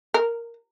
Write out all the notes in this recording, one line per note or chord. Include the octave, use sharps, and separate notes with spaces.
A#4